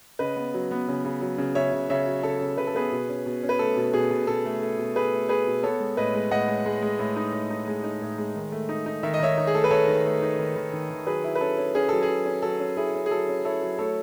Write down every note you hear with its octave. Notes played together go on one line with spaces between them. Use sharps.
C#3 B4 D#5
B3
F#3
B3
C#3
C#3
F#3
C#3
C#3 C#5 E5
C#3
C#3 C#5 E5
F#3
C#3 A4 C#5
C#3
C#3 B4
A4
B3 G#4 B4
B2
C#4
B2
C#4
B4
A3 A4
B2
B2 G#4
B2
B2 A4
A3
A3
B2
A3 G#4 B4
A3
A3 G#4 B4
B2
B3 A4 C#5
G#3
A2 B4 D#5
G#3
A2 D#5 F#5
G#3
G#3
G#3
A2
D#4
A2
D#4
G#3
D#4
A2
G#3
D#3
A3
D#4
D#4
D#3 E5
D#5
D#3 C#5 E5
D#4
G#4
A3 A4
B4
A3 A4 C#5
D#3
A3
D#4
D#3
D#3
D#3
D#3
F#3 G#4 B4
E4
B4
C#4 A4
C#4
C#4 G#4
F#3 A4
G#4
F#3
C#4
F#3 A4
C#4
E4 G#4
C#4
G#4
F#3 A4
C#4
E4 A4 C#5
F#3
A3 A4 C#5